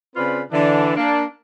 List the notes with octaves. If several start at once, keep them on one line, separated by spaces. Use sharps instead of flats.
C#3 C4 F4 B4 D5 B5
D3 E3 D4
A#3 D4